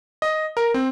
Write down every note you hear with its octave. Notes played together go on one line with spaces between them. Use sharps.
D#5
A#4
C4